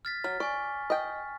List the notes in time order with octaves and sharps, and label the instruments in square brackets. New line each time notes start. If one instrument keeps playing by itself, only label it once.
[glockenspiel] F6 A6 B6
[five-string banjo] F#3 [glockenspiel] F6
[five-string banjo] D5 [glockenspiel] G#5 C#6
[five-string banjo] D#5 G5